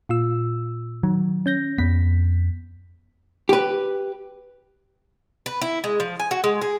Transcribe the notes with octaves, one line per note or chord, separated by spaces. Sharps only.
A#2 F4 E6
D#3 F#3
C#4 G6 A#6
F2 B3 B6
G4 B4
B4
E4
G#3
F3
G#5
F#4
G#3
G#4